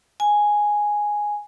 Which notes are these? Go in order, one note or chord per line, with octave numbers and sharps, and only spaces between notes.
G#5